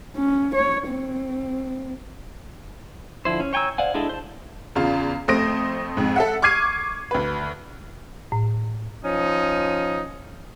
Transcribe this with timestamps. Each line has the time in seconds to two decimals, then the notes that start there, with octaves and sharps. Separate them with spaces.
0.16 C#4
0.55 C#5
0.89 C4
3.25 D3 F3 E4 C5
3.40 C#4
3.53 C#5 G5 G#5 A#5 E6
3.78 C5 D5 F5 F#5 G#5
3.94 G#3 D4 E4 G#4 A4
4.09 C5 A5
4.75 E2 C#3 F4
5.28 F2 A3 C5 D#6 A#6 D7
5.97 F2 G#2
6.16 A4 E5 F#5
6.42 C#6 D6 F6 G#6 C7 D#7
7.11 D2 B4
8.32 A2
9.05 F3 C#4 D#4